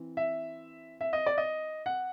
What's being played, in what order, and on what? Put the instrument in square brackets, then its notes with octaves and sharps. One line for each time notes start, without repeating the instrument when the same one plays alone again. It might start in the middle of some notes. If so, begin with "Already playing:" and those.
Already playing: [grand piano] E3 C4
E5
E5
D#5
D5
D#5
F#5